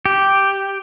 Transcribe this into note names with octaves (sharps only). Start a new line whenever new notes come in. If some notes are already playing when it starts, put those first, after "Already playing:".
G4